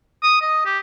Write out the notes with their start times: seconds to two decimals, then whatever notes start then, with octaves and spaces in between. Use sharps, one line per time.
0.23 D#6
0.41 D#5
0.66 G4